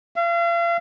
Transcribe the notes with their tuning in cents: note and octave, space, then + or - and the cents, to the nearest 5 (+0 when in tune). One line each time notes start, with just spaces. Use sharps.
F5 -40